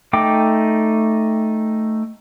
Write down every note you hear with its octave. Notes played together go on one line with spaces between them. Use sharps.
A3 D#4 G5 D6